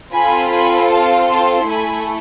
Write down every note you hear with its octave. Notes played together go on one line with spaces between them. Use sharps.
C4 F4 A4 G#5 B5
G#5 B5
F5 A5
A5 C6
A3 E4 A4 G#5 B5